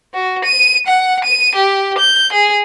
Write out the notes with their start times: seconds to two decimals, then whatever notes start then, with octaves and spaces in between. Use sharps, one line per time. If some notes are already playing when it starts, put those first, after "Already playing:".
0.14 F#4
0.44 D#7
0.87 F#5
1.24 D#7
1.55 G4
1.98 G6
2.33 G#4